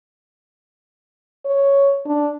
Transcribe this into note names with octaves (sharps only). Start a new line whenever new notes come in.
C#5
D4